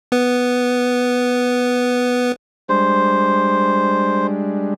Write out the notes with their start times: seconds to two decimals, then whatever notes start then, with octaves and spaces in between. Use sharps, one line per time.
0.12 B3 B4
2.69 G3 G#3 D4 C5